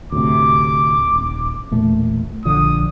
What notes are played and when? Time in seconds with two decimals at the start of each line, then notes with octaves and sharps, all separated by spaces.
0.12 D2 A2 C3 D6
1.14 D#1
1.71 E1 A#2 A3
2.45 A#1 D3 F3 D#6